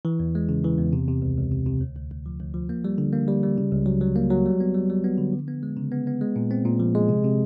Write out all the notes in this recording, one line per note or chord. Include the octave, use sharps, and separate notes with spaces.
E3
E2
G#3
C#3
E3
E2
C3
C3
C#2
C#2
C3
C3
D2
D2
D2
F3
D2
F3
A#3
G3
D3
A#3
G3
G3
C#3
C#2
F#3
F#3
A#3
F#3
G3
B3
G3
G3
B3
D3
F3
B3
G#3
C#3
B3
B3
G#3
A#2
C4
A#2
F3
G#3
C3
C3